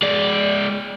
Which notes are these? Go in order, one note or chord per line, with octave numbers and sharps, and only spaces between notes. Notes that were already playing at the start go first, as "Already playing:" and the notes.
G#3 D5